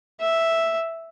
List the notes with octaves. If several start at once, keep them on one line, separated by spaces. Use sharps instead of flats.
E5